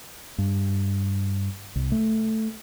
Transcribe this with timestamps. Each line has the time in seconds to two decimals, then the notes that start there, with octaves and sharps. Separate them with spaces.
0.38 G2
1.76 C2
1.92 A3